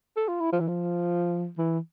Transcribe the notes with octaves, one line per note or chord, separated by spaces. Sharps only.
A4
F4
E4
F3
E3
F3
E3